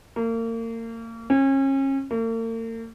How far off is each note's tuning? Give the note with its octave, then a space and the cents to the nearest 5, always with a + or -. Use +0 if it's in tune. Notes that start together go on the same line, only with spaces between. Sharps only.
A#3 -35
C#4 -35
A#3 -45